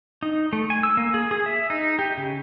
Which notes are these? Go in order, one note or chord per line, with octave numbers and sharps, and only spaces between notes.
D#4
A3
G#5
E6
A#3
G#4
G#4
E5
D#4
G4
C#3